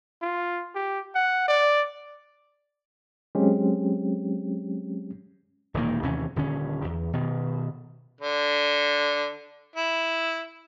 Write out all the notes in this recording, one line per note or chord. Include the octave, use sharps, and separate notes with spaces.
F4
G4
F#5
D5
F#3 G#3 C4 C#4 G4
E1 A#2 D#3 A#3
D#2 C3 E3 C#4
D#1 D3 C#4
E2
B2 D#3
D3
E4